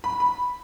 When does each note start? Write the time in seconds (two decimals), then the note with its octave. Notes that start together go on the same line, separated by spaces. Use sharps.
0.04 B5
0.20 B5